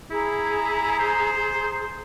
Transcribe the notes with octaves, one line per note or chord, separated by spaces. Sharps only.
E4 G#4 A#5
C5